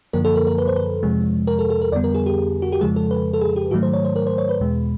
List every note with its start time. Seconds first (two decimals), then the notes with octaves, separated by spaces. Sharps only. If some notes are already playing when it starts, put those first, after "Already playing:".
0.13 F#2 D3 F3 A#3 A#4
0.25 A4
0.36 A#4
0.47 A#4
0.58 B4
0.68 C5
0.76 B4
1.03 F2 C3 F3 G#3
1.47 A#4
1.59 A4
1.70 A4
1.82 A#4
1.92 F2 D3 G3 B3 D5
2.04 A#4
2.15 G#4
2.26 G4
2.62 F#4
2.72 G4
2.81 F2 C#3 F3 G#3 G#4
2.96 A4
3.11 B4
3.33 A4
3.41 G#4
3.56 G4
3.71 G#2 D#3 F#3 A3 F#4
3.83 C5
3.93 C#5
4.05 C5
4.16 A#4
4.27 C5
4.38 C#5
4.49 B4
4.61 E2 B2 G#3